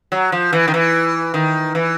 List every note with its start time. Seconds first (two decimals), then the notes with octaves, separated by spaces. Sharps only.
0.12 F#3
0.32 F3
0.53 E3
0.68 D#3
0.74 E3
1.34 D#3
1.75 E3